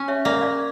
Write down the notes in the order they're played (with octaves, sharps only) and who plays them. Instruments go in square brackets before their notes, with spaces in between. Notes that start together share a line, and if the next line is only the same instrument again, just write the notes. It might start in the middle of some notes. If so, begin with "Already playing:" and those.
Already playing: [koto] C#4
[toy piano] C#5 E5
[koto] A#3 [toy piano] D5 F5
[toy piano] D5 F5